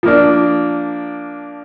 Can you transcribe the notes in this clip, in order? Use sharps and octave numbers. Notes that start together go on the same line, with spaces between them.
F3 A#3 D4